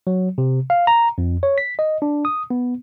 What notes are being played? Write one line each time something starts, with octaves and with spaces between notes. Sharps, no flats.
F#3
C3
F5
A#5
F2
C#5
B6
D#5
D4
D#6
B3